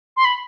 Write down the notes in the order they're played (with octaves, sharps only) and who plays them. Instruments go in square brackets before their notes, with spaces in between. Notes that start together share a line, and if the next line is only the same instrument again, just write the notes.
[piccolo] C6
B5